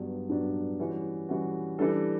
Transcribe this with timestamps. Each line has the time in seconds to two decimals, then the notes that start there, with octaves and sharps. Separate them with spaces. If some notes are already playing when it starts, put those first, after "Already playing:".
Already playing: G2 F#3 B3 D4
0.29 G2 F#3 B3 D4
0.79 E3 G3 C#4 F#4
1.29 E3 G3 C#4 F#4
1.79 E3 G3 D4 A4